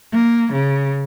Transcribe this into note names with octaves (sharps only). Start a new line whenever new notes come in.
A#3
C#3